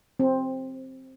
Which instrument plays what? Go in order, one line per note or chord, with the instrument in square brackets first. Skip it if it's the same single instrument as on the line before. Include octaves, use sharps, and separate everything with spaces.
[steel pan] C4